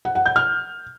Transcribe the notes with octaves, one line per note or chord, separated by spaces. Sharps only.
F#5
F#5
G6
F6